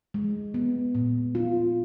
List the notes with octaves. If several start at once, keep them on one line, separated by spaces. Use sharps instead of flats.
G#3
B3
A#2
F4